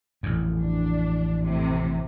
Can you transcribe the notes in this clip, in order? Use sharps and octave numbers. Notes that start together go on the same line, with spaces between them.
A1 F2
D4
A2 C3